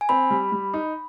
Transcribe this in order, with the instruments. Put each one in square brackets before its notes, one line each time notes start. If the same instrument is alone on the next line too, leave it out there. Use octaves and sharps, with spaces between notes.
[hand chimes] G#5
[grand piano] C4 [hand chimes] B5
[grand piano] G3
G3
D#4